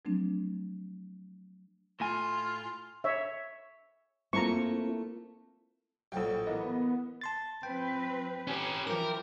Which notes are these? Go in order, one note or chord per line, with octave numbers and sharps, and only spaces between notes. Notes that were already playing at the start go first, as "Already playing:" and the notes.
F3 F#3 A3 C4 D4
A2 A3 F4 G#5
C#5 E5
A3 A#3 C4 E4 F4 A#5 C#6
A#1 A2 F3 F#3 G5
E3 A#3 B3 D#5
A5 C6 A6
F3 C4 B4 G5
C#4 G4
E3 F3 A#4 G5 D6